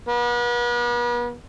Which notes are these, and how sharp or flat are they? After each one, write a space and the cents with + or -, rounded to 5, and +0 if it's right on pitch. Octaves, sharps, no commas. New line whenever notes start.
B3 -40